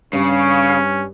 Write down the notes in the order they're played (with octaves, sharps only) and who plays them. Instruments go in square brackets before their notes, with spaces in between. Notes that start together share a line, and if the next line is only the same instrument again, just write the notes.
[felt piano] G2 G3 [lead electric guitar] C#3 [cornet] C#4